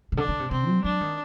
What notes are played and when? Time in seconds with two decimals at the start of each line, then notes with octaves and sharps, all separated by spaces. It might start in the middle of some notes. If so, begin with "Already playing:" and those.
0.12 C3
0.17 D3 D4
0.28 D3
0.40 C3
0.51 C3 C4
0.68 F#3
0.84 F#3 D4
1.01 D#3